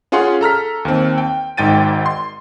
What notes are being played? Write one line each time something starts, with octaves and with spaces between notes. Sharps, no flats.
C#4 F4 G#4 F#5 C6
A4 A#5 F6 B6
D#2 C4
G5
G#1 G#2 G5 A6 D#7
C6